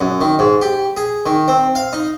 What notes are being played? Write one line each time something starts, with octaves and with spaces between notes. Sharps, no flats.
F#2
D#3
G#2
G4
G#4
D#3
C4
F5
D#4